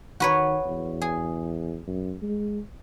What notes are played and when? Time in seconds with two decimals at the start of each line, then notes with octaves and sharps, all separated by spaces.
0.20 D#3 F#4 B4 C#5
0.66 E2
1.02 G#4
1.87 F#2
2.22 G#3